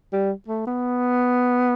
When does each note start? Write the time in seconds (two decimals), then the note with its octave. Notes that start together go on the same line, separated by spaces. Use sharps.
0.12 G3
0.48 A3
0.67 B3